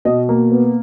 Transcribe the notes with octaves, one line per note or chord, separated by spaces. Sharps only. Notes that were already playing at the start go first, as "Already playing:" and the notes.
B2 D#5
A#3
B3